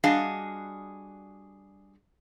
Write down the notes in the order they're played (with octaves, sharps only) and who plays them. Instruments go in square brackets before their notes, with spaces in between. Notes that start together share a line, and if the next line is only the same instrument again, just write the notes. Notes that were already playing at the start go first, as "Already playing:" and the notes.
[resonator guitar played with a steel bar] G3 D4 F#4 G#4 D#5 F5